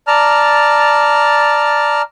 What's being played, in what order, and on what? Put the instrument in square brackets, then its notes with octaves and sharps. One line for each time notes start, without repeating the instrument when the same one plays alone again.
[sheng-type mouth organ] D5 A5 A#5 F6